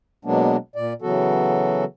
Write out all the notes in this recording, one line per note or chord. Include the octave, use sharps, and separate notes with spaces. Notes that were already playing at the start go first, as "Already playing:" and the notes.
B2 F#3 G#3 A#3 B3 D4
A#2 D5
C#3 E3 F#3 B3 F#4 A4